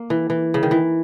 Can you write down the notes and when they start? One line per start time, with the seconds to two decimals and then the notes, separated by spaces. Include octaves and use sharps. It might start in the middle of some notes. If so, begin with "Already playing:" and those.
Already playing: A#3
0.10 E3
0.30 E3
0.54 C#3
0.63 D#3
0.71 E3